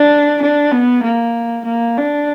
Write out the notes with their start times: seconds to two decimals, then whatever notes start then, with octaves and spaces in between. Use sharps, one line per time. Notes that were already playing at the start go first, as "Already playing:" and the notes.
Already playing: D4
0.42 D4
0.72 B3
1.03 A#3
1.65 A#3
1.97 D4